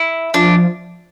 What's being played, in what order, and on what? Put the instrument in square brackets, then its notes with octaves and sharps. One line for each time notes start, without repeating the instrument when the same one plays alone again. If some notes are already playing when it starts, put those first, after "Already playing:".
Already playing: [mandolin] E4
[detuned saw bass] F3 [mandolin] D4